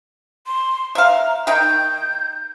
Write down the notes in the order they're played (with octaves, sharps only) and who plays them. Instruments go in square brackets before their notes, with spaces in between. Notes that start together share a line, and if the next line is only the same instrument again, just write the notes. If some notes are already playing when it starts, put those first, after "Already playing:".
[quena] C6
[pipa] E5 F5 [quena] A#5
[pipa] D#3 D#4 G5 [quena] G6